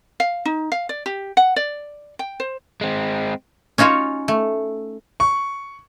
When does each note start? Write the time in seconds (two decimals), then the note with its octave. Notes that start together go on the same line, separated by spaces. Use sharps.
0.20 F5
0.45 D#4
0.72 F5
0.89 D5
1.06 G4
1.37 F#5
1.56 D5
2.19 G5
2.40 C5
2.81 G#3 C4
3.78 C#4 D#4 F4 F#4 C#5
4.28 A3
5.20 C#6